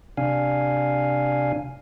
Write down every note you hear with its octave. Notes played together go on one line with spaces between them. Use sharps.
C3 D4 F5 G#5